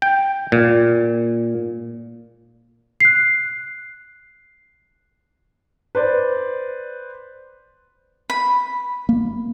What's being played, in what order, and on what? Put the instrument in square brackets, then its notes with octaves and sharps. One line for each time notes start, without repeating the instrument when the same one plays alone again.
[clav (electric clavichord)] G5
A#2
[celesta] F#6 C7
[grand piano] B4 C5 D5
[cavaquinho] B5
[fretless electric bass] A#3